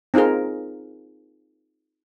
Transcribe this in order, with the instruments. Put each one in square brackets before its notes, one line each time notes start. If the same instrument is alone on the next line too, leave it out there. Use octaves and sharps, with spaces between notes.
[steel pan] C4 D#4 F4 G#4 A#4